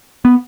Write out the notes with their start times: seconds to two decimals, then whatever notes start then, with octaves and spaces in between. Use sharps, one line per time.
0.25 B3